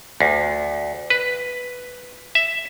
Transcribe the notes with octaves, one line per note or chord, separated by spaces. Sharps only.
D2
B4
E5